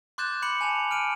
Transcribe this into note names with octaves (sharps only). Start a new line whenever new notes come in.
C6 D6 F#6 G6 A6 E7
B5 C6 D6 C#7 F#7
G#5 A5 F7
F6 D7 D#7